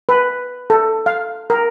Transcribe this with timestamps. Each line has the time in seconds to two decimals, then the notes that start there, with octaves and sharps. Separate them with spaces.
0.09 B4
0.70 A4
1.06 F5
1.50 A#4